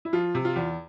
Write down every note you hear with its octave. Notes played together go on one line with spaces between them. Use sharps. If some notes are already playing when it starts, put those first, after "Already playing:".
E4
F3 F4
C3
F4
E2